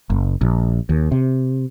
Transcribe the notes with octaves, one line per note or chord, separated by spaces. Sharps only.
F#1
A#1
D#2
C3